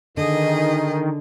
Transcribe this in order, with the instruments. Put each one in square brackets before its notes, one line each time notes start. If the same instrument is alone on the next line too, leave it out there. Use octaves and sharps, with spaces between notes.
[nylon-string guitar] D3 [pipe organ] D#3 [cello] G#4 D#5